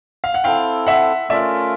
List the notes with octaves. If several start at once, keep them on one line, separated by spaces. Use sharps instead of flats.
F5
F#5
C4 E4 A4 F5 G5
E5 F#5
A3 C#4 F4 A#4 D5 E5